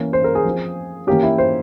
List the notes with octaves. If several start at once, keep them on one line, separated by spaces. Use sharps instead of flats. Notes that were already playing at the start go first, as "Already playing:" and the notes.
Already playing: E3 A#3 C#4
C5
A#4
G#4
F3 C4
E3 A#3 C#4 G4
E4
C5